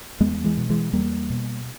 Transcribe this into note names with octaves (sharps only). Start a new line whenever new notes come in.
E2 G#3 B3
E3 G#3
B2
E3 G#3
E2 G3 A#3
B2